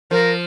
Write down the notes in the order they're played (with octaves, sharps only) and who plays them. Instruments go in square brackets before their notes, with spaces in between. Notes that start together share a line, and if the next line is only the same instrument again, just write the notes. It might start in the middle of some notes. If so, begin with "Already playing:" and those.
[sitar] F3 [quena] A#4